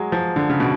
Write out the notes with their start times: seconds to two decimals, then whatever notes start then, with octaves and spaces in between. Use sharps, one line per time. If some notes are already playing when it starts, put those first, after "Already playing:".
Already playing: F#3 G#3
0.12 F3
0.36 D3
0.50 C#3
0.60 B2